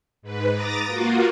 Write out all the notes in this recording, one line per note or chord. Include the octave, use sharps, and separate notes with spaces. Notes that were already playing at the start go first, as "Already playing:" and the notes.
G#2 B4
A#5 D6 D#6 A6 A#6
A#3 F4 F#4